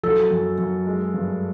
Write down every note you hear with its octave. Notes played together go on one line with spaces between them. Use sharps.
F#3 A4
F#2
F#2
G#3
G2